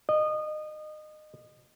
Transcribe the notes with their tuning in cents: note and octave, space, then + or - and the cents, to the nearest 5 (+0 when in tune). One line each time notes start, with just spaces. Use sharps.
D#5 -25